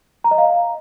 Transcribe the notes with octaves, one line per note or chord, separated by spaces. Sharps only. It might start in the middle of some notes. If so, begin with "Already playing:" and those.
A#5
D#5
F5